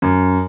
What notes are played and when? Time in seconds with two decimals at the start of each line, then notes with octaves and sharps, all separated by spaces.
0.02 F#2